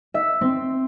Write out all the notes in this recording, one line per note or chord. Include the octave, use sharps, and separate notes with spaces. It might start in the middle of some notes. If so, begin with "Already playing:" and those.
E5
C4